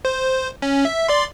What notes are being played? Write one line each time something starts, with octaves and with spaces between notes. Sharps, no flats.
C5
C#4
E5
D5 C6